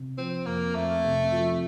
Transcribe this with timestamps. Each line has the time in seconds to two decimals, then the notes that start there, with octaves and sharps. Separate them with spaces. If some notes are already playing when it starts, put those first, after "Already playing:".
Already playing: C3
0.17 F3 C4
0.46 F2 A#3
0.75 F2 A3
1.04 C3
1.32 F3